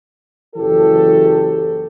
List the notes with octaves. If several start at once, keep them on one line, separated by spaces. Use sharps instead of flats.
F#1 E3 F#3 G4 A4